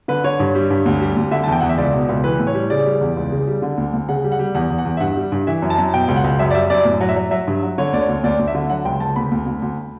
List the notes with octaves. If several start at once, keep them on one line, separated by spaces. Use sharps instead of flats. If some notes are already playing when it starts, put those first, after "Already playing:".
D3 B4
D3 C#5
G2
G3
G2
D2
G3
D2
D3 E5
A5
E2 G5
E2 F#5
E5
C#2 D5
B2
C#2
E3 B4
A2
C#5
G3
C#3 D5
G3
E2
C#2
C#3
G3
D3
D2
D2
C#3 F#5
G3
F#5
G3
E2 F#5
E2
F#5
E2
E5
G2 F#5
G3
G2
E3 E5
F#2
A5
F#2
B2 G5
C#2
F#5
C#2
F#2 E5
D5
G3 E5
F#2 D5
A2
F#3
E5
F#3
F#3 E5
G2
F#3
D3 C#5
D2 D5
C#5
D2
D2 D5
D2
E5
D3
F#3 F#5
C#2 G5
C#2 A5
D2 B5
D2
D2
D2